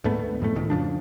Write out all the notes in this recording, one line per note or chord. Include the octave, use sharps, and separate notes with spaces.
D2 G#2 A3 B3
E1 F2 A2 A3
C#2 A2 D#3
F2 C#3 F3 D4